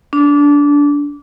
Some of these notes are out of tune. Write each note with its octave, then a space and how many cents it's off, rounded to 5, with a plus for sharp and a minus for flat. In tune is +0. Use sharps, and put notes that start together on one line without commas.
D4 -20